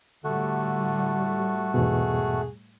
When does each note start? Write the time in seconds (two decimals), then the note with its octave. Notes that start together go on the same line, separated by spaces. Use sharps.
0.24 A2 D3 G3 A3 F#4
1.74 E2 G#2 B2 G#4